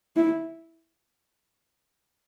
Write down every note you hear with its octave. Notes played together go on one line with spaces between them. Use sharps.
E4